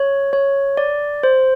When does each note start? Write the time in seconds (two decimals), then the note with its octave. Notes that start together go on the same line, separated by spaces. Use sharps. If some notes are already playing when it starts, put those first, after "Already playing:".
Already playing: C#5
0.33 C#5
0.77 D5
1.23 C5